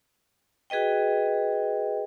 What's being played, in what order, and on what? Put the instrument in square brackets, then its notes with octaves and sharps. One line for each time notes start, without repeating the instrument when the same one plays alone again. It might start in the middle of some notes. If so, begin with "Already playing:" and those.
[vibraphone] F#4 G#4 B4 D#5 G5